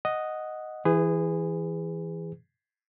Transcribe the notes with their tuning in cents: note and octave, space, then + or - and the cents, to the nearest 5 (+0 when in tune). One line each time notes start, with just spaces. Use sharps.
D#5 +0 F#5 +0
E3 +0 G#4 -15 B4 +35